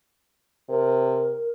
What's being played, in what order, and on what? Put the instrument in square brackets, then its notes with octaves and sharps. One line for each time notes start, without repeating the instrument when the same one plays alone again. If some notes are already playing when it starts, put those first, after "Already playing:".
[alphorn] C3 [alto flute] A#4